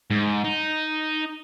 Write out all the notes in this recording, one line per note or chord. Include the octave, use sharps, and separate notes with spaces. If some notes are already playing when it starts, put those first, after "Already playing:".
G#2
D#4